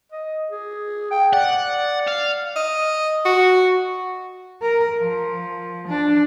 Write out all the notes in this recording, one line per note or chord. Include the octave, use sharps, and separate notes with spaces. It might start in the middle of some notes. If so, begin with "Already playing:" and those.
D#5
G#4
G5
D5 F#5
F5
D#5
F#4
A#4
F3
D4